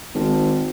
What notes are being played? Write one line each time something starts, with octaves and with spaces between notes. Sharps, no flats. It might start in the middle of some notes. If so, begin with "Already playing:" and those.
G#1